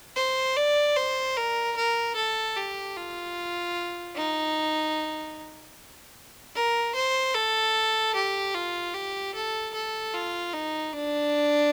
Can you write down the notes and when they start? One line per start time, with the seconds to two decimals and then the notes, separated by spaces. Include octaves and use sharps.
0.16 C5
0.57 D5
0.96 C5
1.37 A#4
1.77 A#4
2.16 A4
2.57 G4
2.97 F4
4.15 D#4
6.55 A#4
6.95 C5
7.35 A4
8.15 G4
8.54 F4
8.94 G4
9.34 A4
9.74 A4
10.14 F4
10.53 D#4
10.93 D4